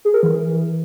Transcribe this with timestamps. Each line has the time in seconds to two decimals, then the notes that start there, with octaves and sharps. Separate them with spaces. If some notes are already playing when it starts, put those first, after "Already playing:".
0.05 G#4
0.14 A#4
0.23 E3